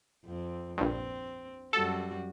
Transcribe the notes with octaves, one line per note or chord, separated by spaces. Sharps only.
F2 C4
A#1 G2 C4
F#2 G3 F#4 A4